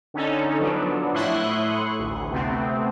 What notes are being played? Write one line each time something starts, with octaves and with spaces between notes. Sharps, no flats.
D3 C#4 D#4 A4
F3 F#3 B3 D4
A2 E4 C6 C#6 D#6 F#6
A1 D2
C3 A3 B3 C4